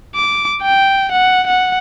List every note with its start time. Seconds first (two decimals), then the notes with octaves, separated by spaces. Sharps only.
0.15 D6
0.62 G5
1.12 F#5
1.47 F#5